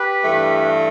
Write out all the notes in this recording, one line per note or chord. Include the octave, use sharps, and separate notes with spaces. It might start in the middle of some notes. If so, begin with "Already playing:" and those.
Already playing: G4 B4
G2 E3 A3